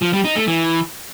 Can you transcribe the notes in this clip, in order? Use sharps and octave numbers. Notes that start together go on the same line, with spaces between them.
F3
G3
D#4
A3
E3